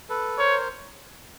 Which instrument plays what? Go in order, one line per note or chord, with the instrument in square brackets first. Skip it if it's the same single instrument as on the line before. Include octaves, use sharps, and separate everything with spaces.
[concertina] A4 B4
[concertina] A#4 C5 [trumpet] C#5